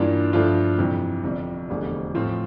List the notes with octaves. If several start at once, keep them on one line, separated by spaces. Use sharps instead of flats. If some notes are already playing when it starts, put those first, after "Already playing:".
Already playing: G2 E3 A#3 D4 F4
G2 F3 A3 D4 F4
F2 C3 E3 G3
G1 F2 C3 G3
F1 E2 D3 G3
A2 F3 C4 F4